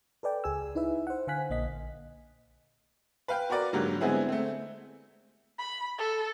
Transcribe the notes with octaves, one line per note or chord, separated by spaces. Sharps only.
A4 B4 D5 G5
C#2 G#4 G#5 E6
D#4 E4 B4 E5
C5 F#5
D3 C5 F5 G#5 F#6 B6
A#1 A#3 D#5 B6
B4 F5 G5
F#4 A#4 B4 D5
G#2 D3 F#3 G3 A#3
D3 G#3 B3 C4 E4 G#4
A3 C4
B5
A4